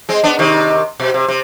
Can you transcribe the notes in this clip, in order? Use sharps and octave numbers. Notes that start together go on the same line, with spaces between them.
G#3 C4
B3 D4
C3 D#3
B2
C3
C3